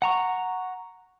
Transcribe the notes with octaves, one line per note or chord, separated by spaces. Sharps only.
F#5 A#5 C#6